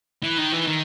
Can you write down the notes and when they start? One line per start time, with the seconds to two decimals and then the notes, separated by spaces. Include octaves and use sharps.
0.23 E3
0.38 D#3
0.53 E3
0.67 D#3